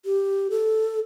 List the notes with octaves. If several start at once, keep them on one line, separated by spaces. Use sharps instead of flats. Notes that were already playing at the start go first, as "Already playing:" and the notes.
G4
A4